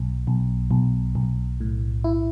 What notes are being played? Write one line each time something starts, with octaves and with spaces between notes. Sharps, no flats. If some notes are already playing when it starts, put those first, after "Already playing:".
Already playing: B1
B1
B1
B1
A2
E4